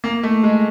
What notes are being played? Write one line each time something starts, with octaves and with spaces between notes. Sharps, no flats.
A#3
A3
G#3